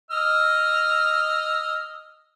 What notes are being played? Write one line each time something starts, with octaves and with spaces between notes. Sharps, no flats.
D#5 E6 F6